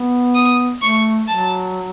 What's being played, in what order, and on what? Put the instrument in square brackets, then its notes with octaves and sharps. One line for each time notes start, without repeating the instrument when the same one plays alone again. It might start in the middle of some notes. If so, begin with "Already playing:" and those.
Already playing: [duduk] B3
[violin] D#6
[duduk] A3 [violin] C#6
[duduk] F#3 [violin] A5